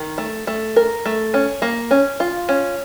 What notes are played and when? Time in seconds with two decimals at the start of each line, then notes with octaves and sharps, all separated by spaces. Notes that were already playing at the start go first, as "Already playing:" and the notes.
Already playing: D#3
0.18 A3
0.47 A3
0.76 A#4
1.06 A3
1.34 C#4
1.62 A#3
1.91 C#4
2.20 F4
2.49 C#4